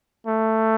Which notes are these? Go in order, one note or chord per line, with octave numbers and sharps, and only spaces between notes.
A3